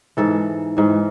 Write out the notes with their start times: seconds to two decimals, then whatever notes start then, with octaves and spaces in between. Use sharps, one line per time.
0.17 G#2 E3 A4
0.77 G#2 E3